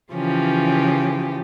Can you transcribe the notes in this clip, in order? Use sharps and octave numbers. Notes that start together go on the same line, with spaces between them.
C#3 E3 F3 C#4 G4